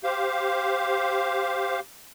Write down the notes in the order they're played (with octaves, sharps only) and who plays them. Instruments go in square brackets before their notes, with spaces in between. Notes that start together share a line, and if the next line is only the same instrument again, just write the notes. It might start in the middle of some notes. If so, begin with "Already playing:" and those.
[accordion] G4 C5 F5